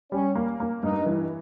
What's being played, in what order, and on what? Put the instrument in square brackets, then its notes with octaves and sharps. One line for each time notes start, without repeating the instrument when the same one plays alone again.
[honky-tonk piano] G3 [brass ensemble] C#4
[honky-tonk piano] A#3
A#3
[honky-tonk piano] G2 [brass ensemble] D#4
[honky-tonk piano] E3